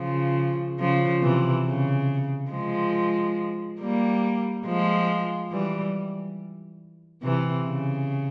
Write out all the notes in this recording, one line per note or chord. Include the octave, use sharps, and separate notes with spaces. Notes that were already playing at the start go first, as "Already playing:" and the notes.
Already playing: C#3 F3
C#3 F3
C3 E3
C#3
F3 G#3
G3 A#3
F3 G#3
E3 G3
C3 E3
C#3